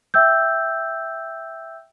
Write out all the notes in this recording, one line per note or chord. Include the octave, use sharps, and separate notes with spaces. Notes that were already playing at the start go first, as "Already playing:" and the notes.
E5 G5 E6 G6